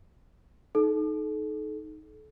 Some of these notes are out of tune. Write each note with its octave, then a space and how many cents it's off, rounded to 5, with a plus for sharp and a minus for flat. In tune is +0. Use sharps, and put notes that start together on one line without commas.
D#4 +0 A4 -35